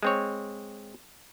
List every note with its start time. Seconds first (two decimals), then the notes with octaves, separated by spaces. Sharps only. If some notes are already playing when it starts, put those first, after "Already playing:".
0.03 G#3 C4 C#5